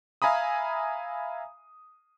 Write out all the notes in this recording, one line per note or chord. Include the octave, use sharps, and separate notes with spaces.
E5 F5 G#5 A#5 B5 D#6